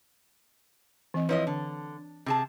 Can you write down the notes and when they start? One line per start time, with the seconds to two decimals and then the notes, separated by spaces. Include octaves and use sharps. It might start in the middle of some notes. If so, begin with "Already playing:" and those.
1.14 E3 C4 D#5
1.29 F3 E4 B4 C#5 D#5
1.47 D3
2.26 C3 G#4 A5